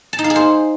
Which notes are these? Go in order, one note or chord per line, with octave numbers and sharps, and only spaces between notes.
A5
D#4
F5
G#4
C5